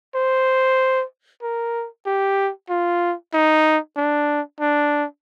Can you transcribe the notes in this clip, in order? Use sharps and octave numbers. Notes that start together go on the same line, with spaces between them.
C5
A#4
G4
F4
D#4
D4
D4